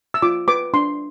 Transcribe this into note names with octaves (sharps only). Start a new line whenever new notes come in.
E6
F4 D6
B4 D6
D4 C6